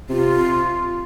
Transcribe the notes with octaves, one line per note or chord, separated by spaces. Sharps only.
C3 F4